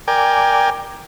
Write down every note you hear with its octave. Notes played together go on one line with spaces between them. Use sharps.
A#4 D5 G5 G#5